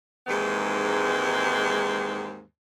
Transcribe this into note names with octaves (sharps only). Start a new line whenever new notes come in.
D#2 G#2 E3 G#3 C4